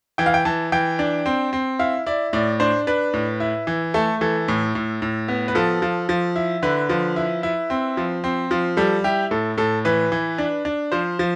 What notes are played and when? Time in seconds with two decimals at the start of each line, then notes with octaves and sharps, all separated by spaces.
0.18 E3 G5
0.26 F5
0.34 G5
0.45 E3 A5
0.72 E3 G5
0.99 D4
1.26 C4
1.53 C4
1.79 E4 F5
2.06 E4 D5
2.33 A2 D5
2.60 D4 C5
2.87 D4 B4
3.14 A2
3.40 E4
3.67 E3
3.94 A3 A4
4.21 E3 A4
4.48 A2
4.75 A2
5.02 A2
5.28 B3
5.48 B4
5.55 F3 A4
5.82 F3
6.09 F3
6.36 E4
6.63 D3 B4
6.89 F3
7.16 E4
7.43 E4
7.70 C4
7.97 F3
8.24 C4
8.51 F3
8.77 G3 A4
9.04 E4 G4
9.31 A2 A4
9.57 A2 A4
9.85 E3 B4
10.12 E3
10.38 D4
10.65 D4
10.92 F3 C5
11.19 F3